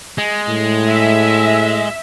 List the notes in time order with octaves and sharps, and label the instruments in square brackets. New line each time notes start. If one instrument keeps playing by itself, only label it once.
[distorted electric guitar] G#3
[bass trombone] A2
[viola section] E5